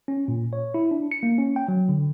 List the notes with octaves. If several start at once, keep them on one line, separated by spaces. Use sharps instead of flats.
C#4
A#2
C#5
E4
D4
C#7
A#3
C#4
G5
F#3
D3